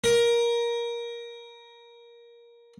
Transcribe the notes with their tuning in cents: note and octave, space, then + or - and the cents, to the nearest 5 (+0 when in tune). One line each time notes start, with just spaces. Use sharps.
A#4 +15